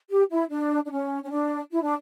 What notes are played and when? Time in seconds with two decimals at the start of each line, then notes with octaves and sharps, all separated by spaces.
0.09 G4
0.30 E4
0.50 D4
0.86 D4
0.90 C#4
1.24 C#4
1.31 D4
1.71 E4
1.82 D4